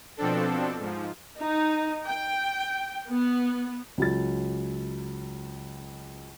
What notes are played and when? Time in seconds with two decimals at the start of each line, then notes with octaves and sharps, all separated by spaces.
0.17 B2 F3 C4 D4 A4
0.79 G#2 F3
1.41 D#4
2.06 G5
3.09 B3
3.98 C#2 F#3 A6